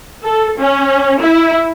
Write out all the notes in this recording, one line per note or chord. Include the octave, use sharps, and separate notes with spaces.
A4
C#4
E4